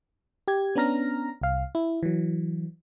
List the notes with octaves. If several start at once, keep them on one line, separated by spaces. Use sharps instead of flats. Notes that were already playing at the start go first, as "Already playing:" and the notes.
G4 G#6
B3 C#4 D4 A#5 F6 A#6
C2 F5
E4
E3 F#3